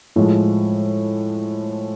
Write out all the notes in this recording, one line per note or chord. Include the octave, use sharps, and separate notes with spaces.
A2 F3 G#3